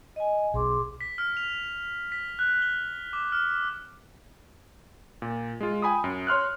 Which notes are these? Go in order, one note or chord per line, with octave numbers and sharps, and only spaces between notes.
D#5 G#5
B1 G#4 C6 D6
B6
F6
F7
B6
F#6
G7
D6
F6
A#2
G#3 F4
G5 G#5 B5 D#6
F#2
C#5 C6 F6 F#6